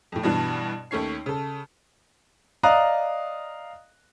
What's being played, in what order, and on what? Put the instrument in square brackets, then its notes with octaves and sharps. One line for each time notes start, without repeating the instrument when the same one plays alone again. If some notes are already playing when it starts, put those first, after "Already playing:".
[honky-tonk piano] F2 A2
G2 B2 E3 D4
D#2 A3 C#4 C#5 C7
C#3 A4
[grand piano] D5 D#5 F5 A#5 D#6 F#6